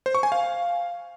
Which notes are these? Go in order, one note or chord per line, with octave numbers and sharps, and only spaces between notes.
C5
C#6
G#5
F5